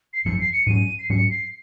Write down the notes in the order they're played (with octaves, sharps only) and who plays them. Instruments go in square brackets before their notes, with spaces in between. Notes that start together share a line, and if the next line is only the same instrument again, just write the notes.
[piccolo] C7
[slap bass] G#1 F#2 F3 [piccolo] C#7
[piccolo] C7
C#7
[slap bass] G#2 F#3 C#4 [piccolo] D#7
[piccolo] C7
[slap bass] G#2 F#3 C#4 [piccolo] C#7
[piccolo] C7